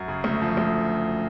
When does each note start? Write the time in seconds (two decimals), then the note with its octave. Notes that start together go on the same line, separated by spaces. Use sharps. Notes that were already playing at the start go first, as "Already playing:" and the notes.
Already playing: F#2 F#5
0.08 C#3
0.24 D2
0.41 F3
0.57 D2